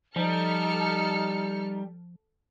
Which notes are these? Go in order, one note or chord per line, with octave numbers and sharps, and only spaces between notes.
F3 G3 D#4 A4 F6 C#7